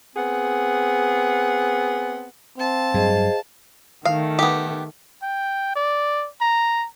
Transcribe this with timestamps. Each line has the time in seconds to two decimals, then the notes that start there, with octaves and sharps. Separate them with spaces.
0.16 B3 C4 G#4 F#5
2.58 C4 F5 A5
2.94 G2 F#3 G#4 C5 D#5
4.05 D#3 A3 F5
4.39 B3 G4
5.22 G5
5.76 D5
6.41 A#5